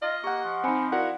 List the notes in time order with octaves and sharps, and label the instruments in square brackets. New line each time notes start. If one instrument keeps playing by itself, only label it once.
[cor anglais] F4 [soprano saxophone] D#5
[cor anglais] A#3 [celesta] G4 [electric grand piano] F#5 C#6
[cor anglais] F3
[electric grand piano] C4 D#4 [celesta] G#5 B5 C#7
[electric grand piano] E4 F#4 A#4 [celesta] D5 F5 [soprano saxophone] F#5